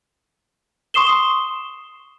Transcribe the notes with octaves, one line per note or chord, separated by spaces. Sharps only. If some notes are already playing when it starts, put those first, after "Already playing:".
C6 C#6 D#6 C7 E7 G7